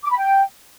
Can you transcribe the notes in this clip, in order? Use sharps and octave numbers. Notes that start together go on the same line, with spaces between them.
D6
B5
G5